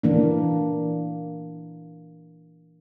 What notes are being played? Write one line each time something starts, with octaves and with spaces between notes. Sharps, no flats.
E3 A#3 D4